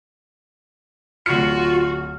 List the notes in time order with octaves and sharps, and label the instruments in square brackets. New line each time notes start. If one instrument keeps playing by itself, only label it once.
[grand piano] D1 C#7 [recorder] F4 [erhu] F#4 [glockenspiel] F6